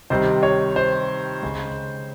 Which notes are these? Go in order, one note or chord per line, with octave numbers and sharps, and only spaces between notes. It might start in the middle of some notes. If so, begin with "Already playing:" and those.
C3 D#3 G3 C5
C#5
C5
C#3 G#3